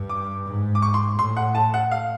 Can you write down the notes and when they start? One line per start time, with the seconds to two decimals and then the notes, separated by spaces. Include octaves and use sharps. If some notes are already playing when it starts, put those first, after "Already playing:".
Already playing: G2
0.09 D6
0.46 G#2
0.75 D6
0.82 C#6
0.94 C6
1.19 A2 C6
1.37 F#5
1.55 A5
1.74 F#5
1.91 F5